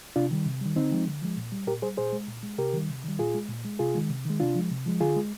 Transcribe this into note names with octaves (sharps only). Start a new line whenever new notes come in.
C3 D4 F4
D#3 G3
C3
D#3 G3
D3 C4 D#4
F3 G#3
D3
F3 G#3
A#2
G3
A#2 G4 A#4
G3 G#4 C5
A#2 G#4 C5
G#3
A#2
G#3
C3 G4 A#4
D#3 G3
C3
D#3 G3
A#2 F4 G#4
G#3
A#2
G#3
C3 F4 G#4
D#3 G#3
C3
D#3 G#3
C3 D4 F4
F3 G#3
C3
F3 G#3
D3 F4 G#4
G#3